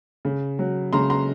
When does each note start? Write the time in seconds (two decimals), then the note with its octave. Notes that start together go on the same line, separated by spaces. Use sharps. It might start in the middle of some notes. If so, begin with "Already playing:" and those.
0.25 C#3
0.59 F#3
0.93 C#3 A#5 C6
1.10 A#5 C6